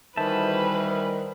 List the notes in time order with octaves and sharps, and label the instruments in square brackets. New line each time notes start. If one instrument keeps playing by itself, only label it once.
[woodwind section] D2 E3 G3 [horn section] D#3 [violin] B4 [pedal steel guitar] C5 E5 A5